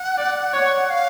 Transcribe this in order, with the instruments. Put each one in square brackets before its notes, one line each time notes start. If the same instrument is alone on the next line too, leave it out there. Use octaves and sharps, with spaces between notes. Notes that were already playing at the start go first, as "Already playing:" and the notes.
Already playing: [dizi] F#5
[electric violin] D5
C#5
[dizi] F5